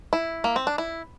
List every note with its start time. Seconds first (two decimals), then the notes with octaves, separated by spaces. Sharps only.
0.13 E4
0.44 A#3
0.56 C4
0.67 D4
0.78 E4